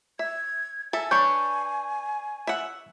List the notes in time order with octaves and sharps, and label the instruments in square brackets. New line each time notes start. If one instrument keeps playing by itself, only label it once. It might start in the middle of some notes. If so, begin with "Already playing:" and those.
[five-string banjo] E5 [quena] G#6
[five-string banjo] A4 E5 [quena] G#5
[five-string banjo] D4 B4 C#5 [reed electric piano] C#6 G6
[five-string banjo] E5 F#5